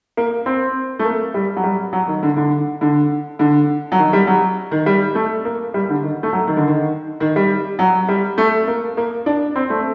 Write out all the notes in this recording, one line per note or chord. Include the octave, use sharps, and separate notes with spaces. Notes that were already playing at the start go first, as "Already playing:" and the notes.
A#3
C4
A3
A#3
G3
F#3
G3
F#3
D#3
D3
D3
D3
D3
F#3
D#3
G3
F#3
D#3
G3
A3
A#3
G3
D3
D#3
A3
F#3
D#3
D3
D#3
D#3
G3
F#3
G3
A3
A#3
A#3
D4
C4
A3